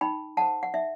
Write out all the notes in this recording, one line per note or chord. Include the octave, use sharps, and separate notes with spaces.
D#4 G5 B5
A4 C5 F#5 A5
F#5
D#4 E5